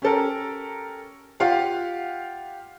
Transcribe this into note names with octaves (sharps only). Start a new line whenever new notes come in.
C#4 G4 A4 A#4
F4 G4 F5 F#5